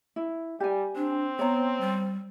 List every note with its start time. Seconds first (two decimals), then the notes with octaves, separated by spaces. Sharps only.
0.16 E4
0.60 G3 G4 G#5
0.96 C4 D4
1.39 B3 C#5 A#5
1.81 G3